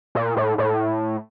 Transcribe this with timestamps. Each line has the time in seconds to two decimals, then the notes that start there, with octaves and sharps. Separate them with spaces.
0.15 A#2
0.37 A2
0.58 A2